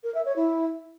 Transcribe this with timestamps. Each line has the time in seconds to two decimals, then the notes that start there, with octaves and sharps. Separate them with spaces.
0.04 A#4
0.14 E5
0.25 C#5
0.36 E4